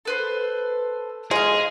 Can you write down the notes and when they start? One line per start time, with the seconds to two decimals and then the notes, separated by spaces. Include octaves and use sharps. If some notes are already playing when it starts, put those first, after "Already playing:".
0.05 A4 B4 C5
1.31 G#3 G#4 D#5 F5